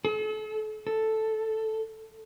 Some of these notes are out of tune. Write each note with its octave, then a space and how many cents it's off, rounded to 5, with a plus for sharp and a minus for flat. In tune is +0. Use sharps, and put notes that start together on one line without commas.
A4 -40
A4 +0